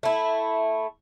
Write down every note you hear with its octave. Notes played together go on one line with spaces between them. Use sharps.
A3 E4